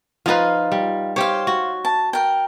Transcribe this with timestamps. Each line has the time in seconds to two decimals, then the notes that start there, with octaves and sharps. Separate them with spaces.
0.26 F3 D#4 F4 B4 F5
0.72 G3
1.16 G4 C5 C#5 F5
1.47 F#4
1.85 A5
2.13 A#4 G5